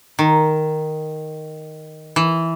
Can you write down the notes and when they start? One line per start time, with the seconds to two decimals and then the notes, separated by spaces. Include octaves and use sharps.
0.19 D#3
2.16 E3